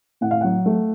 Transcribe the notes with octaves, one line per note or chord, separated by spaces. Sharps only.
A2 F#5
F5
F#3 F#5
A3